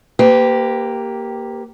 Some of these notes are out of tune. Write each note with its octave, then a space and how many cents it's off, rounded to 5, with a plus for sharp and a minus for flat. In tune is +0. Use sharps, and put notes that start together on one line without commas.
A#3 +0 G4 +0 B4 +40